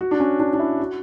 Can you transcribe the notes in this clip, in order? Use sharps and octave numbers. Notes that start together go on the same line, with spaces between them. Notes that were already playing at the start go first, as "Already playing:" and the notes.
F#4
D4
C#4
D4
D4
E4
F#4